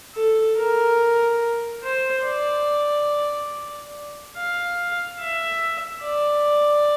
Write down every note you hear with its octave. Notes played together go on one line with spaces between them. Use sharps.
A4
A#4
C5
D5
F5
E5
D5